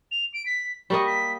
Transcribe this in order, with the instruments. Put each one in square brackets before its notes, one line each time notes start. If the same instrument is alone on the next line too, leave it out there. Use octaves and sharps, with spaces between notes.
[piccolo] F7
D7
B6
[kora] G3 A#3 D#5 [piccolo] C#6
[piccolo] B6